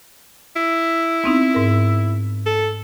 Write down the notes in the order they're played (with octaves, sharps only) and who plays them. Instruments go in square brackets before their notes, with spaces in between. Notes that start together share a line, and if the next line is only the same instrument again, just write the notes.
[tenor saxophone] E4
[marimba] B3 C4 D#4
G#2 A#4
[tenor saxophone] A4